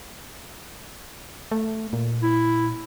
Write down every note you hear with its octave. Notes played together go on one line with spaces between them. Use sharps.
A3
A#2
E4